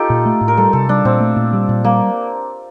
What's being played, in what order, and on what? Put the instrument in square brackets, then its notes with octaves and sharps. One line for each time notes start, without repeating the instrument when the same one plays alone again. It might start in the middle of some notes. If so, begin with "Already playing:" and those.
Already playing: [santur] D#4 F4 G4 A4
[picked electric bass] A#2
A3
A2
[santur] A#4
[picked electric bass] G3 [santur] A4
[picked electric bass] C3 [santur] A4
[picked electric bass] G3 [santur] D4
[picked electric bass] A#2 [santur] C4
[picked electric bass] A3
A#2
G3
A#2
[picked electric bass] G3 [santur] A#3